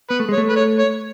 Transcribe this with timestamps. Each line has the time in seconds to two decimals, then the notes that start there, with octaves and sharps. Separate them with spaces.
0.10 B3 B4
0.20 A3
0.29 G#3
0.33 C#5
0.38 A3
0.49 B4
0.56 C#5
0.79 C#5